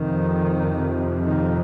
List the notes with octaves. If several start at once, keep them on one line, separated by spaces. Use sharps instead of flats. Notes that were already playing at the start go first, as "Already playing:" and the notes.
Already playing: F2 C3 D#3
D#3